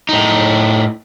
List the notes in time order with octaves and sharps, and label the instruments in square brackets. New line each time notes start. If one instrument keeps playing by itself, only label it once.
[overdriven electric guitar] A2 D#4